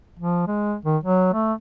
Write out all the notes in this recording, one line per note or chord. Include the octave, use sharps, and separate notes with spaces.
F3
G#3
D#3
F#3
A3